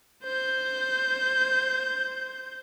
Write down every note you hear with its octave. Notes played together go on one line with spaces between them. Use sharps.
C5 G6